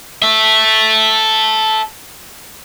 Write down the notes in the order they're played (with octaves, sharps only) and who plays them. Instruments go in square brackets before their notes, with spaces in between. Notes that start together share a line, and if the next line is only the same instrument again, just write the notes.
[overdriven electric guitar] A4 E5